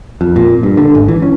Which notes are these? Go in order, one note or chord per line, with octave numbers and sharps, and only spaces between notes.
F2
A#2
G2
D3
G#1
E3
C#4